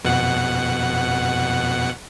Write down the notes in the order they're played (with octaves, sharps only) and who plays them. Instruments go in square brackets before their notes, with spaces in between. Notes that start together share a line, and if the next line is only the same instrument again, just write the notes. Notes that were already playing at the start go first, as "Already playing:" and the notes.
[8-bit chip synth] F2 B2 F#5